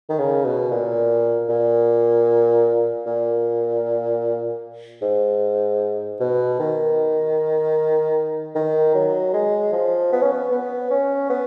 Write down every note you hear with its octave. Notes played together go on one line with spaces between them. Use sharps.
D#3
C#3
B2
A#2
A#2
A#2
G#2
B2
D#3
D#3
F#3
G#3
F3
B3
C#4
B3
B3
C#4
B3